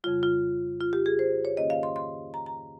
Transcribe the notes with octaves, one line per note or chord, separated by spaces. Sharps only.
F2 C#3 G3 F4
F4
F4
G4
G#4
C5
C#5
G#2 D#3 A#3 C#4 D#5
F5
C6
C6
A#5
A#5